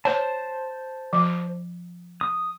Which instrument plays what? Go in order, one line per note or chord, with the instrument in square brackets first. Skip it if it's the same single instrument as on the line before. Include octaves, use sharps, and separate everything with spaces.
[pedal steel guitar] C5 A5 [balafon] C#5
[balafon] F3
[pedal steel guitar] D#6